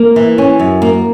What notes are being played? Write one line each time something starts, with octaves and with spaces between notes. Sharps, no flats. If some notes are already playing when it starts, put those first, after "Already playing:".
Already playing: A#3
E3
C#4
F#2
A#3